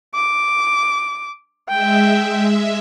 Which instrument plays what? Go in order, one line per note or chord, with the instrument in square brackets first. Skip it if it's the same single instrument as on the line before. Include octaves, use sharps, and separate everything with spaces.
[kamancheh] D6
[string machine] G#3 E5 [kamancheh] G5